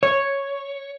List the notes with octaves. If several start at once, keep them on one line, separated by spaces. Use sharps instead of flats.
C#5